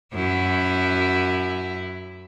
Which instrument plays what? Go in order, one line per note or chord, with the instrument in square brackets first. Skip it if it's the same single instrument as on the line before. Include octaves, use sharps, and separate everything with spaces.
[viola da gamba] F#2 E4